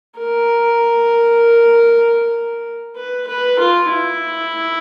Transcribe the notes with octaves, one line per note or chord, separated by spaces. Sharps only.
A#4
B4
B4
F4
E4